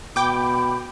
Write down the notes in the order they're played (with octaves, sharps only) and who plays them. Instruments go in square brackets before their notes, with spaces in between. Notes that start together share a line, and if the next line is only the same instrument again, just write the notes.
[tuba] B2 [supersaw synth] G5 D6 [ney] B5